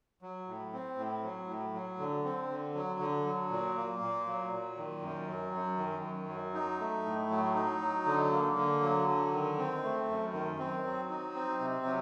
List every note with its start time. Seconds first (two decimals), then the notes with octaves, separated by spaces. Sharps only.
0.22 F#3
0.47 A2
0.73 C4
0.98 A2
1.23 F#3
1.48 A2
1.73 F#3
1.99 D3
2.24 C4
2.50 D3
2.75 F#3
3.00 D3
3.25 F#3
3.51 A#2
3.76 A#3
4.01 A#2
4.26 F#3
4.52 A#2
4.77 D#3
5.02 F#2
5.28 F#3
5.53 F#2
5.78 D#3
6.04 F#2
6.29 F#3
6.54 D#4
6.80 A3
7.05 A2
7.30 F#3
7.55 D#4
7.81 F#3
8.06 D3
8.31 A#3
8.56 D3
8.82 F#3
9.08 D3
9.33 D#3
9.58 C4
9.83 A3
10.08 F#2
10.34 D#3
10.59 C4
10.84 F#3
11.09 D#4
11.34 C4
11.60 C3
11.85 F#3